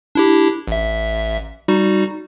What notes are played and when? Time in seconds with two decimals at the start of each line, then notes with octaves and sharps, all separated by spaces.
0.15 D4 E4 G4
0.67 A1 E5
1.68 G3 D#4 F#4